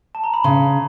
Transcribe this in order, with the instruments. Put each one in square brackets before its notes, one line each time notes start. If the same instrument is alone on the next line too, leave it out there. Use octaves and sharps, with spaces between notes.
[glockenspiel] A5
A#5
B5
[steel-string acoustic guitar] C#3 [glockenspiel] C6